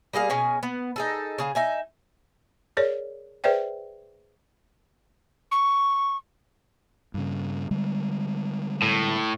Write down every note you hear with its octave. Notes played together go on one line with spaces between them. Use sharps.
G3 A#3 G#4 F5
B2 C#4 G#4 G#5
B3
D#4 G#4 A4
C#3 G#4 F5
D#4 E5 G#5
G#4 A#4 C#5 D5
G#4 B4 C5 D5 E5 G5
C#6
G2 C#3
D3 G3 G#3
A2